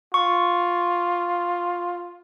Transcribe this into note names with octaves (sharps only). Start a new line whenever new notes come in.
F4 C#6